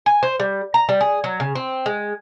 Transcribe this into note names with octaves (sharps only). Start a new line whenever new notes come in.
G#5
C5
G3
A#5
G3
G#4
F#3
C#3
C4
G#3